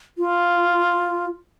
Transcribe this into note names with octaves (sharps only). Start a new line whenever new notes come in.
F4